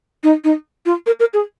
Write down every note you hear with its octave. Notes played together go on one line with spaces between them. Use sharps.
D#4
D#4
F4
A#4
A#4
G#4